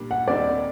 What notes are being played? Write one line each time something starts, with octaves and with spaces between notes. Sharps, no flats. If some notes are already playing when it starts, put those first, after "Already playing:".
Already playing: A#2 G3 D4
F#5
D#2 D3 G3 C4 D#4 D5